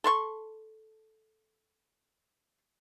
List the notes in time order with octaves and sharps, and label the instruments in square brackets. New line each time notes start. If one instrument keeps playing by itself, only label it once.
[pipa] A4 C6 C#6